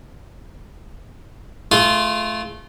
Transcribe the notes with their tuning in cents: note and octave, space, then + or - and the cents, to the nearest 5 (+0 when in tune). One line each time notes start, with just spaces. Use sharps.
A3 -25 F4 -10 G#4 +0